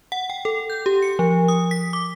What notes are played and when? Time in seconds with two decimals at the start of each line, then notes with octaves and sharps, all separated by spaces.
0.12 F#5
0.30 G5
0.45 A4
0.70 G6
0.86 G4
1.02 C#7
1.19 F3
1.48 D#6
1.71 B6
1.93 D6